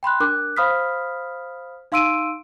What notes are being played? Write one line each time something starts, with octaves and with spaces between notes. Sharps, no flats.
G5 B5 C6 F#6
D4 A#4 D6 F#6
C5 F5 B5 D#6 F6 B6
D#4 F5 C6 E6 D7 D#7